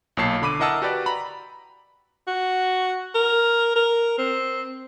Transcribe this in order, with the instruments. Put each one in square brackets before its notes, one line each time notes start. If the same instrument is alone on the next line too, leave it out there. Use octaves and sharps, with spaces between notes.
[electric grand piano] B1 A#2 C#5 A5 C7
D3 B5 D6 D#7
E4 A#4 D#5 F#5 A5 E6
F#4 G4 B4 D5
A#5 B5
[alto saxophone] F#4
A#4
A#4
C4